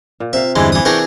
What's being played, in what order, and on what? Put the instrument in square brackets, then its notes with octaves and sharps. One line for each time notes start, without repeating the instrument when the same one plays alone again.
[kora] A#2
[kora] C3 F5 [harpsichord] E5
[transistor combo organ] E2 G2 D3 [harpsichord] E3 G#3
[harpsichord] E3 D#6
[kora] E3 E4 [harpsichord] D4 G#4 A#4 [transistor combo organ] G5 C#6